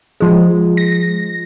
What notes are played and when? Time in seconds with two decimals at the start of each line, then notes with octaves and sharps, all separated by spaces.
0.21 F3 G#3
0.77 A#6